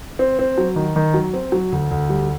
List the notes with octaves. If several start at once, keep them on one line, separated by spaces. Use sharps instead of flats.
C4
C4
F#3
D#3
D#3
F#3
C4
F#3
D2
D2
G3